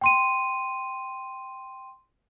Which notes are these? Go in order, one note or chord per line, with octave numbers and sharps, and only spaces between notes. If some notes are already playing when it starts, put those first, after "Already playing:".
G5 C6 D#7